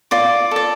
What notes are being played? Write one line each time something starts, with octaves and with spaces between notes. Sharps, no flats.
F4 D5 D6
A4 D5